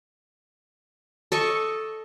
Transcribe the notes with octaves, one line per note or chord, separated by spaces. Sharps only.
A4 D#5 C#6